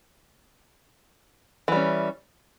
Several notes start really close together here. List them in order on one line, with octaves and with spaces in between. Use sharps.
E3 G3 C#4